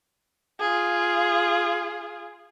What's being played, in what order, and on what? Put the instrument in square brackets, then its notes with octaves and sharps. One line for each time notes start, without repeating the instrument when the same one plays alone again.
[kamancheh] F4 G#4